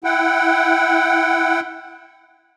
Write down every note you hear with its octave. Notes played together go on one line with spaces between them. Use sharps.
E4 F#5 G5